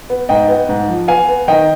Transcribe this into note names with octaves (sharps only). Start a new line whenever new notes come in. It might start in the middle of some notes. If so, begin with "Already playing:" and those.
B3
G#2 D#5 G5
B3
G#2
F3
B3 F5 G#5
B3
D#3 D#5 G5